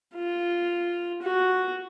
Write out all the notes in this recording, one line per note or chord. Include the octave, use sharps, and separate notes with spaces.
F4
F#4